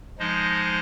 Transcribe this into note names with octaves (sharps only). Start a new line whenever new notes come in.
F3 G#3 D#4 C5 D#5